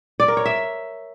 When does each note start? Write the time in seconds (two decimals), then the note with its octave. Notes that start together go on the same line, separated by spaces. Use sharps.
0.20 D5
0.28 A#4
0.37 C#5
0.45 E5